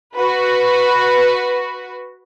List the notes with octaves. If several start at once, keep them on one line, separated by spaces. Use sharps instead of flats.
F#4 B4